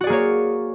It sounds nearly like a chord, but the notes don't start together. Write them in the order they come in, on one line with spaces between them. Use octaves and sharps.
F#4 D5 G#4 A#3 C#5